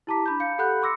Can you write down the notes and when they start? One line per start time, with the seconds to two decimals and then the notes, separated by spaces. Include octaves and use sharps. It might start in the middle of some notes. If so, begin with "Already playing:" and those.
0.07 E4 G4 A5 A#5 D6 B6
0.26 D4 B5 G6
0.40 F5 G6 C#7
0.58 G4 A4 F#5 B5 F#6 G6
0.82 C6 D6 E6 A#6 C#7